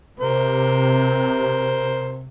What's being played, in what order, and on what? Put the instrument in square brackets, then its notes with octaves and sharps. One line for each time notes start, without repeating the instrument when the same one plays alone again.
[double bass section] C3 [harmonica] A#4 C5